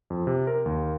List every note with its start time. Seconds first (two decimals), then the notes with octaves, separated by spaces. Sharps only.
0.10 F2
0.27 C3
0.47 A#4
0.66 D#2